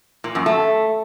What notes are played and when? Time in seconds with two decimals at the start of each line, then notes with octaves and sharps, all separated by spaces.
0.24 A#2
0.35 F#2
0.46 A3